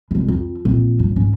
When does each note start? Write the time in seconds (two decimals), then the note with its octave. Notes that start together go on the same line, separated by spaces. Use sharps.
0.11 C2 G#3
0.28 F2
0.65 A#1 C4
0.99 G2
1.16 G#2 C#4